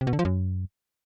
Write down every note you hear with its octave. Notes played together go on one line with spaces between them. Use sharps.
C3
B2
D3
F3
F#2